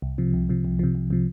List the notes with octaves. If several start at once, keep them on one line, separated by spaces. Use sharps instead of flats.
C2
C3 F3
C2
C3 F3
C2
C3 F3
C2
C3 F3